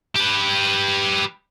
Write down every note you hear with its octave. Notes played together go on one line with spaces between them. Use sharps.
G4 B4